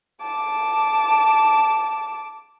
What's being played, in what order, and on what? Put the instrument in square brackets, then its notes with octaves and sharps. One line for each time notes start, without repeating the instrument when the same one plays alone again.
[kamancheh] A5 D6